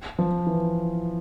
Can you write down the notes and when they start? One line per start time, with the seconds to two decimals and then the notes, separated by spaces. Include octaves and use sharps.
0.19 F3
0.47 E3